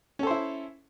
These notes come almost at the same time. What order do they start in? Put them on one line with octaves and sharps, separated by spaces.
C#4 A4 C5 E4